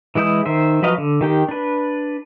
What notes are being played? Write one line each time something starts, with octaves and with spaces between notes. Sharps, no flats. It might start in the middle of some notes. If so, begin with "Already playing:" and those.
E3 G#3 E4 D#6 G6
D#3 C5 E5
F3 F#3 B4 D#5 F5
D3
D#3 G4 G5
D4 B4